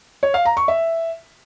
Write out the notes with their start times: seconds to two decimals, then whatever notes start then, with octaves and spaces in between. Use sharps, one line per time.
0.23 C#5
0.34 F5
0.45 A#5
0.57 C#6
0.68 E5